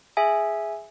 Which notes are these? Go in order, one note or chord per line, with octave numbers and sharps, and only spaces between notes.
G#4 E5 G#5